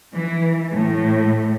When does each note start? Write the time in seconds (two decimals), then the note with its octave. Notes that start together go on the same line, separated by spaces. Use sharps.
0.13 E3
0.72 A2